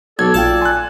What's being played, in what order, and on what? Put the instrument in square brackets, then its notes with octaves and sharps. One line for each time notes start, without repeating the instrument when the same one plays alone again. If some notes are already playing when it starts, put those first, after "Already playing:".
[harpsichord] B1 [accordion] A4 D5 [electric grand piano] G#6
[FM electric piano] A#1 F4 G5 [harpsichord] A5
[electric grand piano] G#5 F#6 [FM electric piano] C6